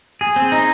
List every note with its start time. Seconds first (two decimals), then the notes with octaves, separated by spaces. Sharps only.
0.21 G#4
0.36 C4
0.52 D#4